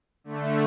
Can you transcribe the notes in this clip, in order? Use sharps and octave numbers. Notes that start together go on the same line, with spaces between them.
D3 A3